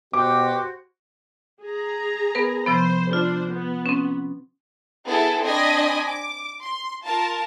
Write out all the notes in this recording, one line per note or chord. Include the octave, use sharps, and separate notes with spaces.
B2 F#4 G4 C5 D6
G#4 A#5
B3 A#4 B4
C3 F3 B3 C5
D4 F4 C5
B3
C4 C#4
B3 E4 G#4 A4
C4 D4 D#5 G#5 B5 D#6
D6
C6
F4 A#4 A5